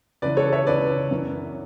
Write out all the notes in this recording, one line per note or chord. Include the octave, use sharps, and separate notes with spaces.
C#2 C#3 E3 B4 D5
A4 C#5
C#5 E5
C#2 C#3 E3 B4 D5
F#2 E3